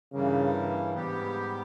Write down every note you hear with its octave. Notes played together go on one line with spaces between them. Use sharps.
G2 C#3 E3 G3 A#3
G#2 G3 B3 G4